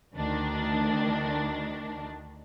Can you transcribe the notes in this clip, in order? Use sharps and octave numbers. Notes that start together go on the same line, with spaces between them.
D2 D#3 D4